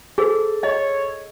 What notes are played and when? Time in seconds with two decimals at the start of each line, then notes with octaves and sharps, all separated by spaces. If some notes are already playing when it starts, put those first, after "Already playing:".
0.18 G#4 A4 C5
0.63 C#5 D#5